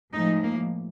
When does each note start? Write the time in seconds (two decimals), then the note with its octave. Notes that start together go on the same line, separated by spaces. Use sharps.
0.13 A2 F3 G#3 D#4
0.42 A#3